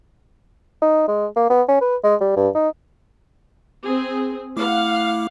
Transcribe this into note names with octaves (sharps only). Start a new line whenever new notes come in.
D#4
G#3
A#3
B3
C#4
B4
G#3
G3
G2
D#4
C4 G#4
A3 E4 F5 F#5 D6